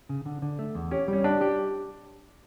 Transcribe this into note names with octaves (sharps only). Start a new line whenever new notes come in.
C#3
D3
D3
A3
E2
C#4 G4
G3
C#4
D4 G4
G4